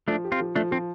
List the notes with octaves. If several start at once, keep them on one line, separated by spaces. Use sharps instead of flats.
F3 A3 D4
G4
C4 F4
F3
F3 A3 D4
F3 C4